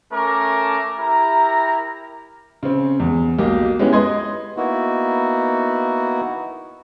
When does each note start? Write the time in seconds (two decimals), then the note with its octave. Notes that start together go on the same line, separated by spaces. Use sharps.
0.12 A3 C#4 A#4 A5 D6
0.99 E4 G4 A#4 A#5
2.63 C#3 C4
3.00 E2
3.38 B1 B2 A#3 G4 D#5
3.79 G#3 B3 C#4 E4 G4
3.93 B4 D#5 C6 G#6
4.57 A#3 B3 D#4 E4 F#4